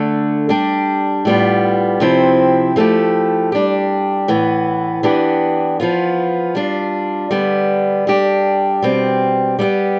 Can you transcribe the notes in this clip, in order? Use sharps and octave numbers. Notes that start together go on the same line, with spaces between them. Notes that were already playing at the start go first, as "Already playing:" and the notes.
Already playing: D3 A3 D4
G3 D4 G4
A2 G3 B3 F4
C3 F3 C4 E4
F3 A3 C4 E4 G4
G3 D4 G4
A2 E3 B3
E3 B3 D4 G4
F3 B3 F4
G3 D4 F4
D3 G3 B3
G3 D4 G4
B2 G3 C4
G3 B3 E4 G4